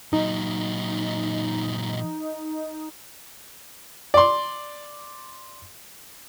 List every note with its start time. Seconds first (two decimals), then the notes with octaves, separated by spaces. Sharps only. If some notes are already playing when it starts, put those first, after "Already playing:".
0.13 A#2 F#3 D#4
4.14 D5 C6